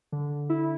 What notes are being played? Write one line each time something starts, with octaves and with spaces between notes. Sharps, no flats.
D3
E4